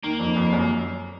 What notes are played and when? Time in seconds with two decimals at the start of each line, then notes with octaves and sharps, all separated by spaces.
0.03 D#3 A#3
0.20 F2
0.36 F2
0.53 F#2